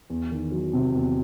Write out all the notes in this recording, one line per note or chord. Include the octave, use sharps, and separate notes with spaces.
E2
D#3
F#3
C3
E2